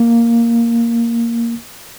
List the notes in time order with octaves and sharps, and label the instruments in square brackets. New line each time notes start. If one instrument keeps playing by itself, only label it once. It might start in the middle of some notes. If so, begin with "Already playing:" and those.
Already playing: [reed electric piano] A#3